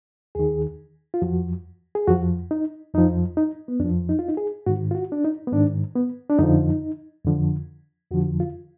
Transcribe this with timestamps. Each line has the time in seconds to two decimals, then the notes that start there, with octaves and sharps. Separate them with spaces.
0.35 D#2 D#3 G#4
1.14 F4
1.22 F2 F3 F#4
1.95 G#4
2.07 F2 F3 F#4
2.51 D#4
2.94 F2 F3 D#4
3.37 D#4
3.68 B3
3.80 F2 F3 D4
4.09 D#4
4.19 F4
4.28 D#4
4.37 G#4
4.66 G#2 D#3 F#4
4.91 F4
4.95 F#4
5.12 D4
5.24 D#4
5.47 B3
5.53 G#2 D#3 D4
5.95 B3
6.30 D4
6.39 F2 D3 F3 D#4
7.25 F2 D3 F3
8.11 F2 D3 F3 F#4
8.40 F4